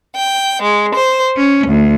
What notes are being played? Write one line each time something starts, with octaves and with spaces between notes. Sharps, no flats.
G5
G#3
C5
C#4
D2